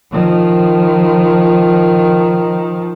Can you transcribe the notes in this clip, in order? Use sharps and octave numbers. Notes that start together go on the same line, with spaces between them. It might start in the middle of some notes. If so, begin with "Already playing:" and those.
D#3 F3